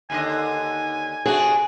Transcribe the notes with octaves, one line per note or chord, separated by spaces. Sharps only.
D#2 D3 D#5 G#5
G#5
C3 D4 F#4 G#4